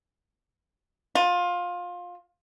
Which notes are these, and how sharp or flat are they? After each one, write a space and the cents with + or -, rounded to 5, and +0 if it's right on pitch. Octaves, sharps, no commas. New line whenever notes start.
F4 +20